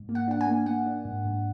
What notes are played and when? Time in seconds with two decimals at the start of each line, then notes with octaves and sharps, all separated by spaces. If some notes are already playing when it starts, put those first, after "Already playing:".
Already playing: G#2
0.09 A#3
0.15 F#5
0.28 D4 F#5
0.41 G#5
0.47 A#3
0.66 A#3 F#5
0.86 D4
1.05 G#2
1.25 G#2